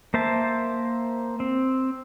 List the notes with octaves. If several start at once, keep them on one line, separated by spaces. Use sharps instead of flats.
A#3 C5 E5 A5
C4